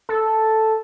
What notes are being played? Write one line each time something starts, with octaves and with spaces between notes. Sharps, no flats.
A4